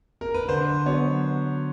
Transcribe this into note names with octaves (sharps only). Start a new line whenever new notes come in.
A#4
B4
D3 C5
F#3 B3 C#5